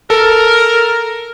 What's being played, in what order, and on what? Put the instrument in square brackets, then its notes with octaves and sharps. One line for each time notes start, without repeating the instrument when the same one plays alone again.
[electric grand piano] A4 [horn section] A#4